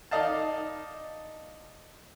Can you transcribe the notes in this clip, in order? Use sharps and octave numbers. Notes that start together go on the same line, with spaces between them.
D#4 D5 D#5 F5 A5